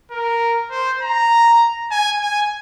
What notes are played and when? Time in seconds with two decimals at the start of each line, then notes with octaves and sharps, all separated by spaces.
0.11 A#4
0.71 C5
1.02 A#5
1.91 G#5
2.21 G#5